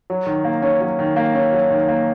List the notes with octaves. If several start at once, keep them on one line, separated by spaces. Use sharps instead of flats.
F#3
D#3
A#3
C#4
F#3
D#3
A#3
C#4
F#3
D#3
A#3